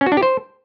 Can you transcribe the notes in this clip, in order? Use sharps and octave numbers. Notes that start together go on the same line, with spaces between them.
C#4
F#4
D4
G4
C5